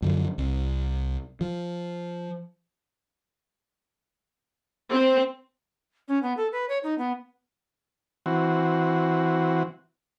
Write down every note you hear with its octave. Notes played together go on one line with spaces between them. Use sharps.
F#2 D3 F3
C2
F3
C4
C#4
B3
A4
B4
C#5
D#4
B3
E3 C4 F#4